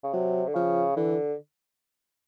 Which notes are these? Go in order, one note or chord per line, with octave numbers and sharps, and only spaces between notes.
C#3
C3 F#3
D3
C#3 F3
D3 E3